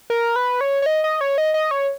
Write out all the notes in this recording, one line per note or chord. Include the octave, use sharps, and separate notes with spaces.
A#4
B4
C#5
C#5
D#5
D#5
C#5
D#5
D#5
C#5